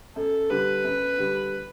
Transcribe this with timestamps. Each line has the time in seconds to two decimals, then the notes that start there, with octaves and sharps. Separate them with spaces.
0.15 F#2 A4
0.50 D3 G3 B4
0.84 F#2
1.18 D3 G3